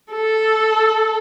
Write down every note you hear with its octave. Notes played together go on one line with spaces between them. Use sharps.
A4